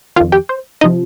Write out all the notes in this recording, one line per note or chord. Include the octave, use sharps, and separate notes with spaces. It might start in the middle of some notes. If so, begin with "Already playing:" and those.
F2 D#3 F4 F5
G4 G5
C5
C3 F3 D#4 D#5